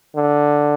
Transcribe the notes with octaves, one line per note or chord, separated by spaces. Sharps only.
D3